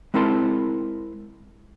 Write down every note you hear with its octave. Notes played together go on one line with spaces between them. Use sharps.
G#3 C4 E4 A#4 A5 C6